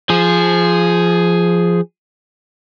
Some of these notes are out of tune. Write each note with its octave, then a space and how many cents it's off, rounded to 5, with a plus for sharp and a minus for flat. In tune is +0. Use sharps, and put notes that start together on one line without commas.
F3 -10 G#4 +0